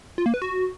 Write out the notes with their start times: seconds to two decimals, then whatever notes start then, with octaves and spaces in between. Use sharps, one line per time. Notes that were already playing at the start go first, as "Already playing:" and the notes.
0.18 F4
0.26 A#3
0.34 B4
0.42 F#4